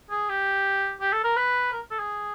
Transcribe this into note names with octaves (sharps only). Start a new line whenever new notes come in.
G#4
G4
G4
A4
A#4
B4
A#4
A4
G#4